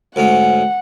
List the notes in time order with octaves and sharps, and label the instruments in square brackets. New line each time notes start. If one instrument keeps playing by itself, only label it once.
[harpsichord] D2 G#2 C#4 [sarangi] F#5